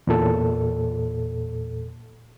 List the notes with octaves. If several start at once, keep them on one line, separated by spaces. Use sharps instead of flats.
E2 A#2 A4